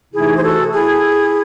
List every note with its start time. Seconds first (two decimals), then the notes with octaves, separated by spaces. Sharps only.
0.13 C3 E3 A3 D#4 E4 G#4
0.37 C5
0.43 F#4 A4
0.73 E4 G#4